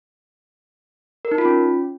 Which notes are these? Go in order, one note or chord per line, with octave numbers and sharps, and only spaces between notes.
A#4
D#4
F4
C#4